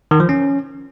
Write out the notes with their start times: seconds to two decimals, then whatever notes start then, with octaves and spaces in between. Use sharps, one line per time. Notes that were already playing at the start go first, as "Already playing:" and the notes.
0.11 D#3
0.20 F3
0.29 C#4